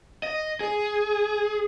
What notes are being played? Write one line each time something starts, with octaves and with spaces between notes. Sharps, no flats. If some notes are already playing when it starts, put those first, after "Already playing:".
D#5
G#4